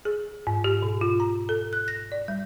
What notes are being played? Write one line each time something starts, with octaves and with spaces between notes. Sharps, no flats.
G#4
G#2
G4
B2
F4
A#5
A4
F#6
A#6
D5
G3